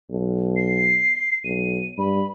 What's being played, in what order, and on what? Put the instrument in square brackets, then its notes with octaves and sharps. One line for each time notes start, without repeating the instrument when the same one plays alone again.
[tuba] B1
[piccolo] C7
[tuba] B1 [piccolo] D#7
[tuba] G2 [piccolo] B5